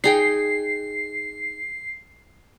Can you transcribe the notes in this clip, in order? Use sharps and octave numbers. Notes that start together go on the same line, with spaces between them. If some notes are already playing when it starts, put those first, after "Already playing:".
D#4 G#4 G5 C7